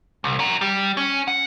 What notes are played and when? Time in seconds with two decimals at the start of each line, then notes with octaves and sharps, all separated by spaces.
0.24 C2
0.39 C#4 A#4
0.61 G3
0.97 C#4
1.28 F#5